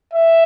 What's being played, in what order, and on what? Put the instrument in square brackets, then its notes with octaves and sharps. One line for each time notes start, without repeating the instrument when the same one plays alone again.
[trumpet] E5